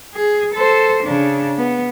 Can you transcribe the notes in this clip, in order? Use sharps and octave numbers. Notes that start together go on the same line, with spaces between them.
G#4
A4 C5
C#3 D4
B3